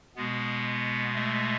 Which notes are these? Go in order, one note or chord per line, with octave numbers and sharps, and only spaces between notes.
B2 G#3 B3
A3